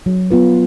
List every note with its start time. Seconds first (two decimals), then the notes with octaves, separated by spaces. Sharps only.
0.06 F#3
0.31 B3 F4 B4